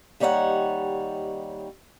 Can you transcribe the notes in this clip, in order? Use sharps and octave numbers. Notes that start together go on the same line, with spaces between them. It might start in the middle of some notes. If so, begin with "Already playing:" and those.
D#2 G3 D#4 C#5 F5 F#5